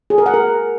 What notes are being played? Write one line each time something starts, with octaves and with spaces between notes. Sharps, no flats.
G#4
A#4
F#5
A#4